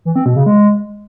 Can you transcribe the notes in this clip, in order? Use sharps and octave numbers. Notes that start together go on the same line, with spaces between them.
E3
C4
B2
C#3
G#3